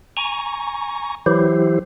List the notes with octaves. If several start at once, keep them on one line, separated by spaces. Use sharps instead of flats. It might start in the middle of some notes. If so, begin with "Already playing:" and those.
G#5 A#5 C#6
E3 F#3 E4 G4 C5